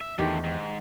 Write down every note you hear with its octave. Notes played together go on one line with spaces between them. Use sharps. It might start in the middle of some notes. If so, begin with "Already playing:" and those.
E5
E2 A2 D3 D#3 G4
G#2